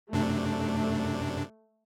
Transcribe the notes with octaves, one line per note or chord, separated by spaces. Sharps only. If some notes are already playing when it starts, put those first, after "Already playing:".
F#2 C3 A3 D4